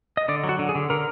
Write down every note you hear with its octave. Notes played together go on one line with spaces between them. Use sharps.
D#5
D3 D5
F#3
F#4
D3
G#4
D3
D3 A#4